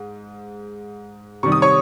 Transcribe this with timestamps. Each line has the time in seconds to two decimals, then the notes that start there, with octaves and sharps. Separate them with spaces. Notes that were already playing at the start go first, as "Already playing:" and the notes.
Already playing: G#2
1.43 C3 D#3 G3 C#6
1.52 D#6
1.62 C#5 C#6